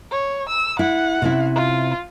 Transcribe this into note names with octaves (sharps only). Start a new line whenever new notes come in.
C#5
E6
E4 F#5
C3 C#4 E4
F4